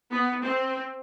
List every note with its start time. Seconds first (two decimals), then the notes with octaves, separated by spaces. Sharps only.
0.11 B3
0.43 C4